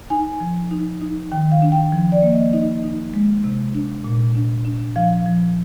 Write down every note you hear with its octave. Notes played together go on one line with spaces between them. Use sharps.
D#4 G#5
F3
D#4
D#4
D#3 G5
F5
D4
G5
F3
D5
A#3
D#5
D#4 D#5
D#4
G#3
C3
D4
A#2
D4
D4
F3 F5
F3